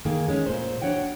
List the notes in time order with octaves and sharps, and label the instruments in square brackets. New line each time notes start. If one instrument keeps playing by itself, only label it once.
[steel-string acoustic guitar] D#3 A#3 G#4
G#3 C#4
A#2 C5
D4 D#4 F#4 C#5 F#5 G5